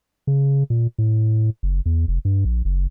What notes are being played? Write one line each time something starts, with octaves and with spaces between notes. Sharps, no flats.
C#3
A#2
A2
F#1
E2
F1
G2
A#1
F#1